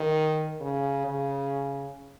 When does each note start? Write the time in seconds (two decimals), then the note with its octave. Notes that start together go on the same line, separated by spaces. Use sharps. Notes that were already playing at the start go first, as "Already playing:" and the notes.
Already playing: D#3
0.61 C#3
1.06 C#3